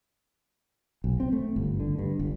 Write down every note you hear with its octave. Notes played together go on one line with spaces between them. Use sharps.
B1
C4
A3
G1
D3
G2
G1